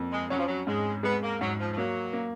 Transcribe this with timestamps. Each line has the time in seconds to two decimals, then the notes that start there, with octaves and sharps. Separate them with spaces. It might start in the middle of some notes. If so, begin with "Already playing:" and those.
Already playing: F2 A#3
0.12 G#3
0.30 F#3 C#4
0.39 F3
0.47 F#3
0.67 G#2 G#3
1.03 G#3 B3
1.22 A#3
1.40 G#2 F#3
1.59 F3
1.72 F3
1.77 F#3 A#3
2.13 A#3